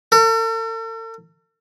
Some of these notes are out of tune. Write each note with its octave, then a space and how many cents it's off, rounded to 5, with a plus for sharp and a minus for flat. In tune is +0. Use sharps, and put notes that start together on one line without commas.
A4 +45